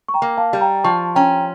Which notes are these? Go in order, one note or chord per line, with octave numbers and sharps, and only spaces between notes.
C#6
G5 A#5
A#3
F5 A5
G3
G5 A#5
F3 A5 C#6
C#4 G5 A#5